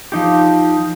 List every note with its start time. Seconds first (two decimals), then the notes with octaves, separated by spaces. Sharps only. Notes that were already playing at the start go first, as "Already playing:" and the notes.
0.12 F3 D#4 G4